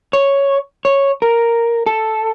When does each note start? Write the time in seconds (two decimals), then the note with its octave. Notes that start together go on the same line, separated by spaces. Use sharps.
0.13 C#5
0.85 C#5
1.22 A#4
1.86 A4